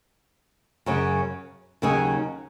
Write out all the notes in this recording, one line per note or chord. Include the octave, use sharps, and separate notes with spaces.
F#2 C#3 F#3
D#2 C#3 F#3 D#4 G#4